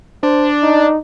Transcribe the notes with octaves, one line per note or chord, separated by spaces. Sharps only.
D4 C5
D#4